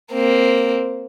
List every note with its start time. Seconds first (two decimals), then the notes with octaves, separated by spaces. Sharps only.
0.13 A#3 C4